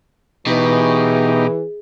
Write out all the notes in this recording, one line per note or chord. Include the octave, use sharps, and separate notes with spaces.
G#2 B2 E3 D#4 G4